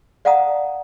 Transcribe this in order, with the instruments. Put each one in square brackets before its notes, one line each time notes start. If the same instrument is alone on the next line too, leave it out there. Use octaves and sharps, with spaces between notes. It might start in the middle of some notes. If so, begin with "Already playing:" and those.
[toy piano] D5 F5 F#5 A5 A#5 D#6